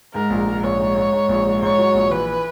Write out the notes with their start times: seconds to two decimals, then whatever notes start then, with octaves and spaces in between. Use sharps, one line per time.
0.14 G#2 A#4
0.30 A#1
0.47 G#2
0.63 A#1 C#5
0.80 G#2
0.96 G#2
1.13 G#2
1.29 A#1
1.45 G#2
1.62 G#2 C#5
1.78 F#3
1.95 A#1
2.11 E3 B4